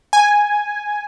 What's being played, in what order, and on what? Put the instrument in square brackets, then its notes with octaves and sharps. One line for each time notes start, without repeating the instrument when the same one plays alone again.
[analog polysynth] G#5